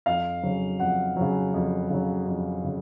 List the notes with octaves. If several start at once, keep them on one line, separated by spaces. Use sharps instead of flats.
F2 F5
C#3 F#3
F2 F#5
C#3 F#3
F2
C#3 F#3
F2
C#3